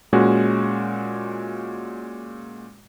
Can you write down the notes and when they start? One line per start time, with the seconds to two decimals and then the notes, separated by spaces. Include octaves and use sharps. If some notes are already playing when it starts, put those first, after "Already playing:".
0.13 A#2 G#3 C#4 F#4